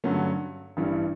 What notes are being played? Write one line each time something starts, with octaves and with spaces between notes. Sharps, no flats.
G2 D3 F#3 A3 C#4
A1 G2 E3 G3